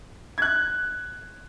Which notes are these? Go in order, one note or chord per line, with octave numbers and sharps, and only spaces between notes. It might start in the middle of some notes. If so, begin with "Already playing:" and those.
F#6 G#6